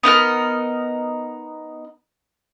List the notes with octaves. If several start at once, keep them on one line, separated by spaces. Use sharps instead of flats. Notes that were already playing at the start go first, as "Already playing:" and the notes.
B3 D#4 A#4 F6